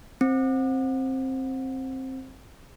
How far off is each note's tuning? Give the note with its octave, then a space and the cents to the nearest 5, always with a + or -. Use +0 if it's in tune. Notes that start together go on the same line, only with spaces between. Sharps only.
C4 +10